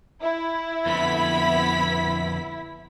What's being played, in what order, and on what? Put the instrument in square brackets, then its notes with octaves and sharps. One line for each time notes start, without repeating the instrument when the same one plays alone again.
[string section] E4
[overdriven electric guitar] F2 D3 [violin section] B3 B5 B6